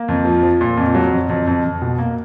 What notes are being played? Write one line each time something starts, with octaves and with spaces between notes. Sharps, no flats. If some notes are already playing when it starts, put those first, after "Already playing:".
Already playing: A#3
F2
F3
F3
A#2
F2
F#3
F2
F2
F2
F2
B2
A#3